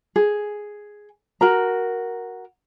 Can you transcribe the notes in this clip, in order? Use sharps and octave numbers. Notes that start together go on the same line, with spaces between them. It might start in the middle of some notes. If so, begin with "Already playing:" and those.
G#4
F#4 A#4 A#5